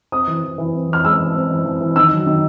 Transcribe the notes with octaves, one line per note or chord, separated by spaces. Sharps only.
C4 D#6
E3
E3
E3
C4
E3 F6
G#3 E6
E3
C4
E3
E3
E3
D#3 E6
F#3
D#3